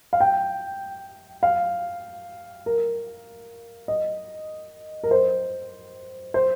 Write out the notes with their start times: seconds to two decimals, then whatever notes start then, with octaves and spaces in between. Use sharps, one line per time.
0.13 F5
0.21 G5
1.43 F5
2.66 A#4
3.88 D#5
5.04 A#4
5.11 C5
6.34 C5